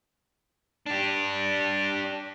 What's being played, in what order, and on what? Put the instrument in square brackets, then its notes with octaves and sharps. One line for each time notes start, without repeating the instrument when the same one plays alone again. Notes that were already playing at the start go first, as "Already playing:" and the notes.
[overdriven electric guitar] D4 G4